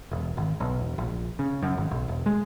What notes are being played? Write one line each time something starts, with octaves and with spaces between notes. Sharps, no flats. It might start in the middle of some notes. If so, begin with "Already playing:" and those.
E1
G#1
B1
E1
A#1
C#3
F#2
G#1
B1
E1
G#3